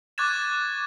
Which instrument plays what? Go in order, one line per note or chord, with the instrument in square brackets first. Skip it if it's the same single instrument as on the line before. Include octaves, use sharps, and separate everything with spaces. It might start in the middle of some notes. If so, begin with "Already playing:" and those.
[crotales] C#6 D6 F#6 G#6 A6 E7